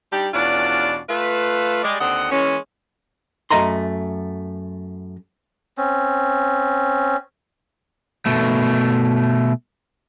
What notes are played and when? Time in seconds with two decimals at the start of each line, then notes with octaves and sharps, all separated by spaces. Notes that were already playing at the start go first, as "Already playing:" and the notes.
0.12 G3 D4 D#4 G4
0.33 E2 B2 C#4 D4 F4 D5
1.09 A3 F4 B4
1.83 G3 G#3 D5
2.00 D#2 D3 C4 D#5 F#5
2.31 E3 G#3 A#3 C#4
3.50 F#2 A3 D#5 A#5 C6
5.78 C4 C#4
8.26 B2 A3